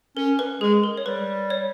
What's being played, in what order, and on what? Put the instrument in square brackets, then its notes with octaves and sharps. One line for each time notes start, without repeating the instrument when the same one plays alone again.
[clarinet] C#4 [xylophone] A#4
[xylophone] B4
[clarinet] G#3 [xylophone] G#4
[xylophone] A#4
C#5
[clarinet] G3 [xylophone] B4
[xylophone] C#5